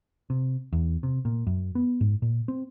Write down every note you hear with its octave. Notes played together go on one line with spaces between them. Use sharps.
C3
E2
C3
A#2
F#2
B3
G#2
A#2
C4